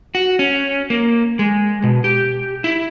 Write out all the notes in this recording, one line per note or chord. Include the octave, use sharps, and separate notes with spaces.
F#4
C#4
A#3
G#3
B2
G4
E4